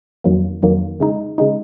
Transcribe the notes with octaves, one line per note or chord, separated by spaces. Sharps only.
F2 D#3 F#3 A#3
F2 D#3 F#3 A#3
C#3 G#3 D#4
C#3 G#3 D#4